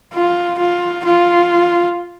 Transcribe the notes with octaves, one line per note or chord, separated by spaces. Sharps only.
F4
F4
F4